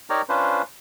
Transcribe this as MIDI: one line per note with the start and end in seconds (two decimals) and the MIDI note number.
0.10 0.22 63
0.10 0.22 67
0.10 0.22 70
0.10 0.22 73
0.10 0.22 74
0.10 0.22 82
0.29 0.62 61
0.29 0.62 62
0.29 0.62 65
0.29 0.62 71
0.29 0.62 72